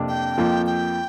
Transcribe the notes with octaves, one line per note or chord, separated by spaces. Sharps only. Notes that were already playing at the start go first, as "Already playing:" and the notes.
Already playing: F2 C3 A#3 D4
G5
F2 F3 A#3
G5